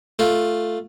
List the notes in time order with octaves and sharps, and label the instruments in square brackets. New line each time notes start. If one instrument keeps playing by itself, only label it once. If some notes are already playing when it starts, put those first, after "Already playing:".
[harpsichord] A3 F4